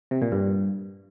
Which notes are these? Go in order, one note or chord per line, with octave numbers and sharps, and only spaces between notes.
C3
A#2
G2